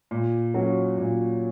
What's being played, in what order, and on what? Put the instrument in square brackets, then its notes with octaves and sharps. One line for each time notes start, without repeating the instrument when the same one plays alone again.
[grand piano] A#2
F#3 C#4 F#4
A#2